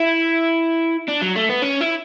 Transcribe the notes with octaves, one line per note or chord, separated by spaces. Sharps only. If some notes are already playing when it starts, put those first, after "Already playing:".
Already playing: E4
D4
F#3
A3
B3
C#4
E4